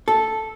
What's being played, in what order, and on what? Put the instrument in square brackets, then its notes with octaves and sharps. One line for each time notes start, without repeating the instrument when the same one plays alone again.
[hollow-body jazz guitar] A4